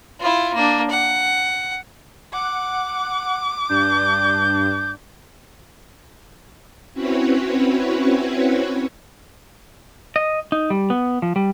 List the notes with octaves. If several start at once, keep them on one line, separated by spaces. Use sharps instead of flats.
E4 F4
A#3 D4
F#5
F#5 D6
G2 D4 G6
C4 C#4 E4 F#4 B4 C#5
D#5
D#4
G3
B3
F3
G3